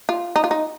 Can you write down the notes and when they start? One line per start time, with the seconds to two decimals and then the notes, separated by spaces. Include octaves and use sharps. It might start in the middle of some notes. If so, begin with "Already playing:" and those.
0.09 F4
0.36 D#4
0.44 F4
0.51 D#4